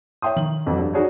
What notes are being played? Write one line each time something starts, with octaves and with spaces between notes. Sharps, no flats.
C#5 E5 G5 C6 D#6
D#3 F#7
F2 E3 F#3
G2
D#4 F#4 G#4 C#5 D5